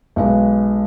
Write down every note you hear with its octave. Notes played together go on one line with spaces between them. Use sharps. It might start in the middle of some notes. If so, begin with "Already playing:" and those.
B1 G#3 B4